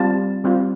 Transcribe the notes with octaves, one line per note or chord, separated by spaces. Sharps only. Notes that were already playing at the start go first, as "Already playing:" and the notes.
Already playing: G3 C4 F4 A5
G3 C4 F4